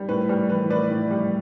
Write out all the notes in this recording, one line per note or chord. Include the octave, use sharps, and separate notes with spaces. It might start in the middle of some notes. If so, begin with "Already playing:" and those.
Already playing: G3
A2 B4
G3 B4
E3 B4
A2 B4 D5
A2
G3